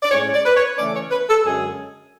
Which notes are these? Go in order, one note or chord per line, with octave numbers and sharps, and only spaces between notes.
D5
A2 G#3 C#4 C#5
D5
B4
C#5
C#3 E3 A3 C#4 D5
C#5
B4
A4
F#2 D3 G#3 C#4 G#4